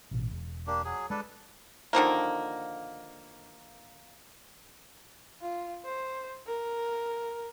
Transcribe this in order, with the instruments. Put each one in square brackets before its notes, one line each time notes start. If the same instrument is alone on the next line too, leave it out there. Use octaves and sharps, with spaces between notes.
[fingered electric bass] A1 B2
E1
[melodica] A#3 D4 G4
F#3 G#4
[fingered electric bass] G#3 [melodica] D4 A4 B4
[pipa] D3 D#3 F3 A#3
[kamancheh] F4
C5
A#4